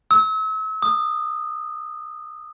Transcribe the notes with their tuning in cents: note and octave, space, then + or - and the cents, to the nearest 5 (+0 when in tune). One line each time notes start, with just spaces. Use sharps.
E6 -40
D#6 -25